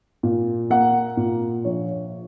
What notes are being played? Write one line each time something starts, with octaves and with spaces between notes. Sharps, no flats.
A#2
A#3 F#5
A#2
A#1 C#5